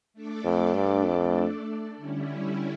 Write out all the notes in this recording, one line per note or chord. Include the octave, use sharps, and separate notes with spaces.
A3 D4 A4 D5
F2
G2
F2
D3 G3 C#4 E4